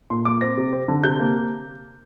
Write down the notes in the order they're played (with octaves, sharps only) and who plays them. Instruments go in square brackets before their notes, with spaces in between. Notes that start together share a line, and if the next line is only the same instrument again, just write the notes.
[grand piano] A#2 C6
A#3 D6
C4 A#6
C3
C4
D3
C3 G6
A#3